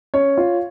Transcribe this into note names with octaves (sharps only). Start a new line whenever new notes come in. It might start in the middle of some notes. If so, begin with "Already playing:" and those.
C#4 C#5
F4